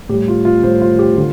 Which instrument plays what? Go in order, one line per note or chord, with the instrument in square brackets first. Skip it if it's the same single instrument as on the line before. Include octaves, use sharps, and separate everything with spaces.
[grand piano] A2 G4
G3
F4
F4
A2 G3 C5
F4
G4
D3 F4